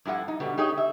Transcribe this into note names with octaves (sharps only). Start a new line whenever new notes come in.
G2 F3 E4 G4 F#5 G#5
D#4
B2 D3 G3 B3
D#4 G4 G#4 C#5 D#5
E5